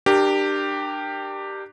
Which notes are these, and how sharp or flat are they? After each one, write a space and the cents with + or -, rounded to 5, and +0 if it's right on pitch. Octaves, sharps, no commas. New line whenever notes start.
D4 +30 G4 +0 A#4 +0